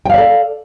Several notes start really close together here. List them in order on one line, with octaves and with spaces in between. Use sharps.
G5 F5 D5 A4